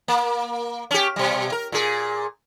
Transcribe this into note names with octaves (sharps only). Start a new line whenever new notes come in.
A#3
C#4 G4
B2 G3
A#4
A#2 G#4